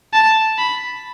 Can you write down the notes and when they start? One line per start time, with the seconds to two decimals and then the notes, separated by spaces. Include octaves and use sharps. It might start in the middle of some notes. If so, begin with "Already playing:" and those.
0.13 A5
0.58 B5